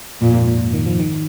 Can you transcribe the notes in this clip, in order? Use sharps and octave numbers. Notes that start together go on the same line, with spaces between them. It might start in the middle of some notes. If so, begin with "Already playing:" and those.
F2 A#2
G#2
A#2
D#3
F3
D#3